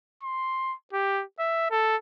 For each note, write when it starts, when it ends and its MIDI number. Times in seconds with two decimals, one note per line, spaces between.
0.23 0.74 84
0.93 1.23 67
1.39 1.66 76
1.70 1.96 69